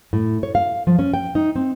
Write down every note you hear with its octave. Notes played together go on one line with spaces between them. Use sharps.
A2
C#5
F5
F3
C#4
G5
D#4
C4